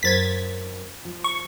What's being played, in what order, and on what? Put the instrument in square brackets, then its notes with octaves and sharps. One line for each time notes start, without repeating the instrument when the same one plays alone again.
[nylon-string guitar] F#2 A#4 C5 [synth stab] G#6 A6 B6
[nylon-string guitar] F3
[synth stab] C#6